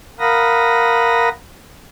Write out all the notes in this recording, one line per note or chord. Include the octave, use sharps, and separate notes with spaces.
A#4 F5 F#5 B5 D#6 A#6